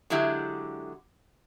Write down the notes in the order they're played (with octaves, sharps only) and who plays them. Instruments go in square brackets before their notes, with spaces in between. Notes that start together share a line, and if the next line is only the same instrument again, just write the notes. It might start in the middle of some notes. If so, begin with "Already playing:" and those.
[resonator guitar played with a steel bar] D3 F#3 G#3 E4 G4